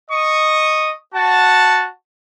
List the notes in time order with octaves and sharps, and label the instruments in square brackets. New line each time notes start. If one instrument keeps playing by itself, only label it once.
[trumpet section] D#5 C#6 D#6
F#4 F#5 A5